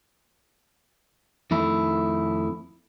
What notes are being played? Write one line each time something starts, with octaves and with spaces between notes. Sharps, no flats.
F2 D#3 A3 E4